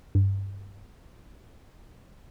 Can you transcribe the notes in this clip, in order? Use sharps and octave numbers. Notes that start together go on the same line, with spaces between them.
G2